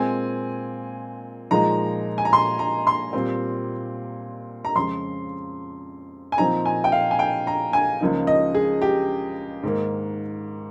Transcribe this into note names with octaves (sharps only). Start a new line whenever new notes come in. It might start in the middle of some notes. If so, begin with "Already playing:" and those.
Already playing: A#2 G#3 C4 G#5
A#2 F3 G#3 D#4 A#5
G#5
A#5
C6
A#5
C6
A#2 G3 C4
A#5
F2 C#3 G#3 C6
G#5
A#2 F3 C4 D#4 A#5
G#5
G5
F5
G#5
G5
A#5
G#5
C#2 C#3 F3 A#3 D#4
D#5
G#4
G4
G#2 D#3 A#3